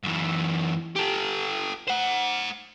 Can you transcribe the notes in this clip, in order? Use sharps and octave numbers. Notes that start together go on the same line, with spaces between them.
F#2 E3
G4 A4
C5 F#5